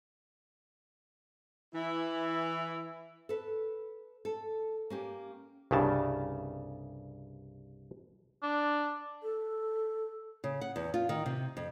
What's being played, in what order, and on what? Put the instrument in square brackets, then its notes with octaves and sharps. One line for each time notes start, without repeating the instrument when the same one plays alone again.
[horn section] E3 E4
[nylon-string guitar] A4 B4
A4
A#3 C#4 G4
[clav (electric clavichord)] C2 G2 C#3 A5
[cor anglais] D4
[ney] A4
[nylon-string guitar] C#3
F#5
E2
F4
D#3
C3
F2